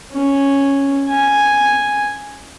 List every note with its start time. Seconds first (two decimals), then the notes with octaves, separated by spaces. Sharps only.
0.12 C#4
1.09 G#5